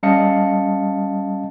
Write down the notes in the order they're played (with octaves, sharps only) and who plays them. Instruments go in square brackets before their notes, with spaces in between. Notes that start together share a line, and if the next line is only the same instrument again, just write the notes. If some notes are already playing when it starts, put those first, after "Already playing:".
[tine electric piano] G3 C#4 D#5 F5 A5 C#7